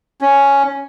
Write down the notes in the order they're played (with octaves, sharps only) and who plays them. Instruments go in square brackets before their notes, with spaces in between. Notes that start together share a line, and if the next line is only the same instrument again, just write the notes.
[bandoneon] C#4